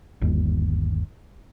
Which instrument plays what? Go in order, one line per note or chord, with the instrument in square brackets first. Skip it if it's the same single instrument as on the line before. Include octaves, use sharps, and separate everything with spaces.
[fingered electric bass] G1 D#2